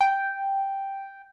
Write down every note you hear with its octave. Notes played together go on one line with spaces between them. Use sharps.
G5